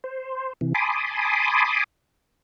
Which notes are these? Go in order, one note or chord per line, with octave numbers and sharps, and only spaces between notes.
C5
C3 E3
G#5 A5 B5 C6 D6 D#6